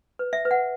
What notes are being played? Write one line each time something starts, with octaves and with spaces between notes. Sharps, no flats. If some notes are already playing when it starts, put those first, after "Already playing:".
B4
E5
B4
F#5